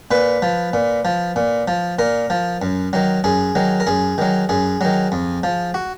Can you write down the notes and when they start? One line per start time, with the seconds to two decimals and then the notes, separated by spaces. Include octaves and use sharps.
0.11 A#2 B4
0.42 F3
0.73 A#2
1.05 F3
1.36 A#2
1.68 F3
1.99 A#2 A#4
2.30 F3
2.62 F#2
2.93 D#3 F#3
3.24 F#2 G#4
3.55 D#3 F#3
3.80 A#4
3.87 F#2 G#4
4.18 D#3 F#3
4.49 F#2 G#4
4.81 D#3 F#3
5.12 F2
5.44 F3
5.74 F#4